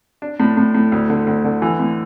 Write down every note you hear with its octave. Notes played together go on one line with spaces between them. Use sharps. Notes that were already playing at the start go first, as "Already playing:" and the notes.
D4
A2
A2
A2
D2
D3
D2
D3
E3
A2